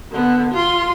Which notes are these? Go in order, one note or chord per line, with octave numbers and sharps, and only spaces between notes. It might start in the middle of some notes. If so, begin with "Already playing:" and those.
D3 B3
F4 C6